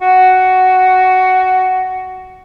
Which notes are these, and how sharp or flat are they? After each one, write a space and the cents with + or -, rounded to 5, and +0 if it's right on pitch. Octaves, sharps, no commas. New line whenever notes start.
F#4 +10